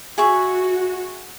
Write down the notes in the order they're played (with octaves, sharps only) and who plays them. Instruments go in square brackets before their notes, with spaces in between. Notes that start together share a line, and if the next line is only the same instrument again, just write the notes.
[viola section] F#4 [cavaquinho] G#4 E5 C#6